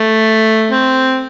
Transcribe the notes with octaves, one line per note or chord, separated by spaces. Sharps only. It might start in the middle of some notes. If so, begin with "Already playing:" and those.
Already playing: A3
C4